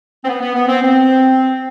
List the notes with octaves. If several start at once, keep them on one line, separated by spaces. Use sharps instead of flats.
C4
B3
B3
B3
C4
C4